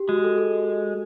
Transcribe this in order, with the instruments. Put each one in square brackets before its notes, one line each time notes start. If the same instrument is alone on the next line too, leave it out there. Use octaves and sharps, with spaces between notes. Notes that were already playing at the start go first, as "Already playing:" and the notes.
Already playing: [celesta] G4
[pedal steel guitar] G#3 [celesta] F#4
[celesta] A4
A4